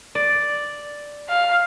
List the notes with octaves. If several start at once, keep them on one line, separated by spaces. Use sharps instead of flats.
D5
F5